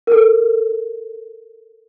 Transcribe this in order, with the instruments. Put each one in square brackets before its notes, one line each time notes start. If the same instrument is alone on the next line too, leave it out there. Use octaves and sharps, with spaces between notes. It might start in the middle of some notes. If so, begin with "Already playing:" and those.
[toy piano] A4 A#4